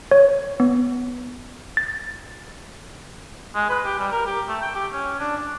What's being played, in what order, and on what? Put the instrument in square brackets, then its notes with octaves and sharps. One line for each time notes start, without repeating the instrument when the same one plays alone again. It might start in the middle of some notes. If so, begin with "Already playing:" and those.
[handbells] C#5
B3
A6
[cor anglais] G#3
B4
G4
G3
A#4
G4
A3
G5
G4
C#4
D4
D4